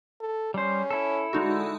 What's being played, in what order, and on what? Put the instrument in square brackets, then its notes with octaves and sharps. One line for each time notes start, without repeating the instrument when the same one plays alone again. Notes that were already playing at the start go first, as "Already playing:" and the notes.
[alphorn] A4
[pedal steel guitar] G3 C5 [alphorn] C#4
[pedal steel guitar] E4 A4
[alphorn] D3 [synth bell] G#3 D#4 F#4